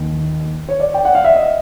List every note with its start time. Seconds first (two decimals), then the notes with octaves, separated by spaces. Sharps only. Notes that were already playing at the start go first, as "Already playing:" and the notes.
Already playing: D#2 D#3
0.69 C#5
0.80 D5
0.94 G5
1.05 F#5
1.15 F5
1.24 E5
1.35 D#5